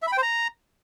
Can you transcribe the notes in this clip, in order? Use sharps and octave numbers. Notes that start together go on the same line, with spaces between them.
E5
B5
G5
C5
A#5